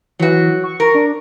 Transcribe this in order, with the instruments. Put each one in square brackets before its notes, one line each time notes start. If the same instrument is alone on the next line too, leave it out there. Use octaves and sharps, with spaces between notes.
[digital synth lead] E3 [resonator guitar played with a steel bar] F#3 F#4
[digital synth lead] C#6
[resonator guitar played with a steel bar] A#4
[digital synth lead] D4